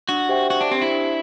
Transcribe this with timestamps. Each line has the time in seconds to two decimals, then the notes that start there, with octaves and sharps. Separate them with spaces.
0.09 D4 F#4
0.29 G4 C5 E5 G5
0.50 D4 F#4
0.61 D4
0.70 C4 G4 C5
0.82 E4
0.92 D4